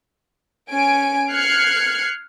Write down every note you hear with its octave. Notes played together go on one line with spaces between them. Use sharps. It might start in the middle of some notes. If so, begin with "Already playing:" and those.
C#4 G#5 D7
F6 F#6 G#6 C7 C#7